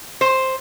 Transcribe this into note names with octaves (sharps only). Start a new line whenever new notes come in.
C5